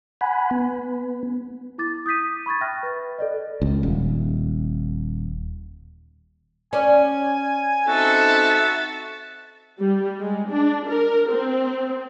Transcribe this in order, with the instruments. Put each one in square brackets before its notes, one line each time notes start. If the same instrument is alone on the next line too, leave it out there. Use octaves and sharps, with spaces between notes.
[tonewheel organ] F#5 G#5 B5
B3
[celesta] E4 D6 A6
D#6 G6 B6 D#7
B5 C#6 G#6 A6
E5 G5 B5 F6 F#6 A#6
B4 A6
A4 D5 D#5
[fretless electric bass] C#2
D#1
[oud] C#4 D5 [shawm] G#5
[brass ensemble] C4 D#4 A4 [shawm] F#4 [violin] E5 A6
[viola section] G3
G#3
D4
A#4
C4